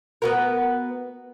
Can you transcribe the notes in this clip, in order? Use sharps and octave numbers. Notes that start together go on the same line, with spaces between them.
B3 F#4 A#4